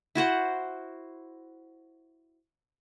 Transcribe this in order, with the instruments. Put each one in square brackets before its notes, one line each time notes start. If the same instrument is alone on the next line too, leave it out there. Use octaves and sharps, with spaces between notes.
[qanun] E4 F#4 C5 F#5